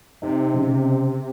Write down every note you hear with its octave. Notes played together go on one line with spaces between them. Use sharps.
C3 D#4
C#3